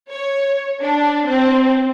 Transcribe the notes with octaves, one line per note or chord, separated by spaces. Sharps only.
C#5
D4
C4